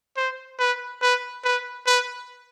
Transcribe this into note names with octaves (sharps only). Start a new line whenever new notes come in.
C5
B4
B4
B4
B4